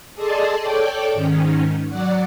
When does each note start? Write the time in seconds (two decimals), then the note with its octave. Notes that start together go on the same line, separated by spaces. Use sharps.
0.15 G#4 A4 D5 D#5 A5 C6
0.60 A4 C#5 D5 G5 D6
1.13 G#2 D#3 C#4
1.89 F#3 D5 F#5